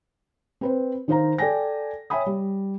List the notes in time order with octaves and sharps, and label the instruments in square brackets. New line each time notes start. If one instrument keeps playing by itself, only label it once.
[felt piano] C4 B4 C5
D#3 D#4 C5 F5 A#5
A4 D5 G5 G#5 A#6
C#5 E5 G5 G#5 B5 D#6
G3